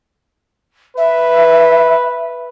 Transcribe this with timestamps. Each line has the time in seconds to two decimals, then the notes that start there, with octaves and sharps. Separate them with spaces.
0.97 B4 E5